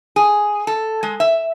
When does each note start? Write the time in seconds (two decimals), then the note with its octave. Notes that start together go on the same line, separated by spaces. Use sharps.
0.16 G#4
0.67 A4
1.03 G#3
1.20 E5